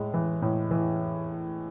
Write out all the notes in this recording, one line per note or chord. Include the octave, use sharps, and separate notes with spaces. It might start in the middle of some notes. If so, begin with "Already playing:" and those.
Already playing: A2 G#3
E3
A2
E3